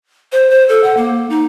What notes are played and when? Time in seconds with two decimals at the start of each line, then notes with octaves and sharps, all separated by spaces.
0.32 C5
0.50 C5
0.69 A4
0.84 F#5
0.97 A#3
1.30 D#4